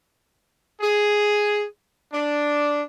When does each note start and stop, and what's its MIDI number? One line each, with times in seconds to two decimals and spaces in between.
0.81 1.65 68
2.13 2.81 62